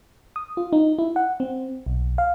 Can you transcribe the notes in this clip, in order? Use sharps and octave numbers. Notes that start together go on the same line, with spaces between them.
D#6
F4
D#4
E4
F#5
C4
B1
F5